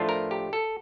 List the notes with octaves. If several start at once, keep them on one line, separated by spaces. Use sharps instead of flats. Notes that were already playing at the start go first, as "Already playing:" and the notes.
Already playing: A2 F3 A3 D4 F4
A#4
G4
A4